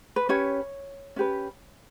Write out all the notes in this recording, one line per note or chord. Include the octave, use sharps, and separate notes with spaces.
B4
C#4 G4 B4 C#5
C#4 G4 B4